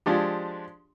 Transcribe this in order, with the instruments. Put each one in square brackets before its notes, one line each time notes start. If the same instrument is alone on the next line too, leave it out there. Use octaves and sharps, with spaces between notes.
[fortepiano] F3 G#3 D4 G4